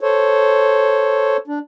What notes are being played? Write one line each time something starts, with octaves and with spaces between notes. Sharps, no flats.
A4 C5 C#5
D4